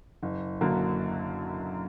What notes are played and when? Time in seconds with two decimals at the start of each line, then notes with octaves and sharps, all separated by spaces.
0.23 F#1
0.61 F#2 D3 F#3 A#3